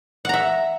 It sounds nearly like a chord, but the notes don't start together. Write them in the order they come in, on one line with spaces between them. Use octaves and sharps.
F#5 A#5 E5